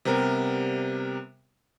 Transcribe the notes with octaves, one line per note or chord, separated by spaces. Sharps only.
C3 G3 B3 A#4